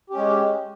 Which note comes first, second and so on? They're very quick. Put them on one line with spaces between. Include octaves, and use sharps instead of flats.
G4 C#4 G#3